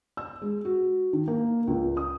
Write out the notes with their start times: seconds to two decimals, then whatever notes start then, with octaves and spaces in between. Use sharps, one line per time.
0.17 E6
0.42 G#3
0.65 F#4
1.13 D#3
1.28 A#3
1.68 C#2
1.97 D#6